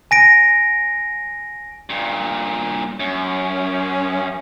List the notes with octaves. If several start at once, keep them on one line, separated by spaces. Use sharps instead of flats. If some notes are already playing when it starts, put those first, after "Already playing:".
G#5 A#6 D7
G2 A#2
F#2 C#4